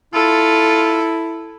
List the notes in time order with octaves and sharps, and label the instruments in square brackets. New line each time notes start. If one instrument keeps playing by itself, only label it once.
[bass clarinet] E4 [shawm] F4 [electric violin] A4